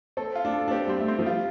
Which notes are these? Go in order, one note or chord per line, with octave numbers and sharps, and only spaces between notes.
C4 A4
F4
D4
A4
D4
C4 G4
G3 C4
A3
C4
F3
G3 F4